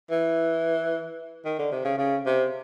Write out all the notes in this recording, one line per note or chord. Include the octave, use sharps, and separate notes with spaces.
E3
D#3
D3
C3
C#3
C#3
C3